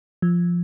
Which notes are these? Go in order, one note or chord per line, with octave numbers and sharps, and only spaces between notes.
F3